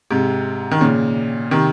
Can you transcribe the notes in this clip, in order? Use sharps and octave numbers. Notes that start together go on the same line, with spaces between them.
G#2 C3
D#3
A#2 C#3
C3 D#3